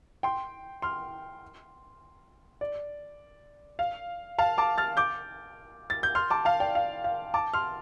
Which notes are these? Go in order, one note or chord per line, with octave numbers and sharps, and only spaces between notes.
G5 C6
C6 F6
D5
F5
F5 A5
A5 D6
F6 A6
D6 G6
A6
G6
C6 F6
A5 D6
F5 A5
D5 G5
F5
F5
A5 D6
C6 F6